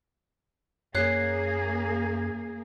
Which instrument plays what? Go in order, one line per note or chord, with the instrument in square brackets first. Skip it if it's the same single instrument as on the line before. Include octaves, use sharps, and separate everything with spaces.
[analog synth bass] F#2 [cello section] A#3 G#4 [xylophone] C#5 F#6 [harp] C7